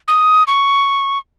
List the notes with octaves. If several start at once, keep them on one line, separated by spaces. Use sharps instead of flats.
D#6
C#6